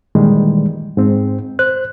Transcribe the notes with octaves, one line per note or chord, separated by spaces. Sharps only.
A#2 D#3 E3 G3 G#3
G#2 C4
C5 F#6